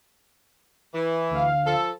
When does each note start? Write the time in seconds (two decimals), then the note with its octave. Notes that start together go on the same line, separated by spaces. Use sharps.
0.94 E3
1.30 D2 F5
1.66 F3 A4